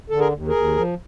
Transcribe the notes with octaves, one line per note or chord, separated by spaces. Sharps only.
D3 A4
G#4 A#4
D#2
G#4 A#4
D#2
F3